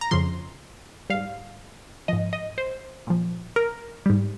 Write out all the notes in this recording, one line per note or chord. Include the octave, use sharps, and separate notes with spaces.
A#5
F2 C#3 F3 C6
G#2 G3 F5
G#2 F3 D#5
D#5
C5
A#2 F3
A#4
G#2 G3